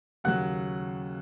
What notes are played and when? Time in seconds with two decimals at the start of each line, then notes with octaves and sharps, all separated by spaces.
0.24 D#2 C#3 F#3 F#5 F#6